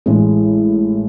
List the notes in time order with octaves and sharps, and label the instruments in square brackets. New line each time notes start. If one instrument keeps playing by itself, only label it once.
[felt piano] A1 A2 E3 G#3